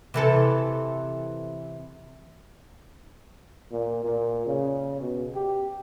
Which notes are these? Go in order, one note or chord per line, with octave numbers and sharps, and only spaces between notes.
C3 E3 A4
A#2
A#2
C#3
B2
G4